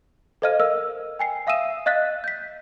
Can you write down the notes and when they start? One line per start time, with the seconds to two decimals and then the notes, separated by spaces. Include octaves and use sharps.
0.42 A4 C5 D#5 F5 F6 D#7
0.60 A#4 D#5 F5 E6
1.19 G5 G#5 C7
1.47 E5 F5 D#6 E6 D#7 E7
1.86 D#5 F5 F#6 A6 B6
2.24 G6 B6